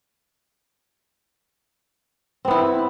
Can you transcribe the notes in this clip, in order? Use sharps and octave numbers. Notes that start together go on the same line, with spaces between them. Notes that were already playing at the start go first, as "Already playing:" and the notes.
B3 C4 E4